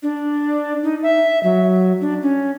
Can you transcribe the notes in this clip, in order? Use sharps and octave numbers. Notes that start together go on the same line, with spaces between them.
D4
D#4
E5
F#3
D4
C#4